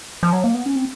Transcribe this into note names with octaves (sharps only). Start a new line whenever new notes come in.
F3
F#3
A#3
B3
C#4
C4